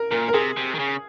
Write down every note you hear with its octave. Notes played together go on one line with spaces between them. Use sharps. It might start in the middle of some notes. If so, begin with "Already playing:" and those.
Already playing: A#4
A#2 A#4
A#4
C3 G#4
C3
D#3
C#3